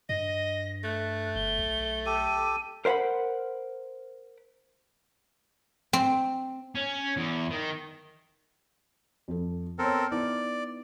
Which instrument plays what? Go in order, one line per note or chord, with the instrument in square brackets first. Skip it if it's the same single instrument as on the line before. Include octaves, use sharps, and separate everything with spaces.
[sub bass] G2 [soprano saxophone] D#5 [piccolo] A#6
[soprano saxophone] A3 [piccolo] F#6
[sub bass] G1 [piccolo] G7
[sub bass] B1
[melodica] G4 A4 [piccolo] D#7
[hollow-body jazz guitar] A#4 C5 F5 F#5 B5
[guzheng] C4
[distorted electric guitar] C#4
E2
D#3
[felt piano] F2 A4
[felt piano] B3 C#5 [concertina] C4 A4 A#4
[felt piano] B3 D#4 E4 [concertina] D5